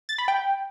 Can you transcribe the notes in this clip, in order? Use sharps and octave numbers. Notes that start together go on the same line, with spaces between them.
A6
B5
G5